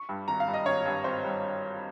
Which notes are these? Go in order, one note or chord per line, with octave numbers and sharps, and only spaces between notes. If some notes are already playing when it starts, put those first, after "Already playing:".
Already playing: C#6
G2 G3
G#1 A#5
F5
G2 G3
D#5
G#1 C#5
G2 G3
G#1 C5
G2 G3